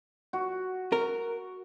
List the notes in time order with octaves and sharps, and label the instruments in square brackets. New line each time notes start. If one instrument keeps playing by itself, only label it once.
[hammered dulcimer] F#4
[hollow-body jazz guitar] A#4